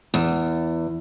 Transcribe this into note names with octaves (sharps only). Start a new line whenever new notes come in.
E2